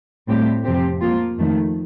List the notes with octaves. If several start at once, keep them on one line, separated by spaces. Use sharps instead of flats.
A2 G3 C4 G4
F2 C3 F3 C4 G4
F3 A#3 F4
F2 D#3 A3